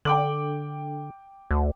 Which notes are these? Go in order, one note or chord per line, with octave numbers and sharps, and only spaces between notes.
D3 G5 D6 F#7
D2